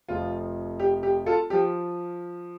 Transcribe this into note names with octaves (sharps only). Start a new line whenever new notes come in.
F1 F2 F3 F4
G4
G4
F4 A4
F3 G4